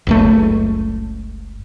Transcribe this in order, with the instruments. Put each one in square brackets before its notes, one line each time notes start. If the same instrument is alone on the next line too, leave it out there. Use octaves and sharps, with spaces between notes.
[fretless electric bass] F#1 C#2 A3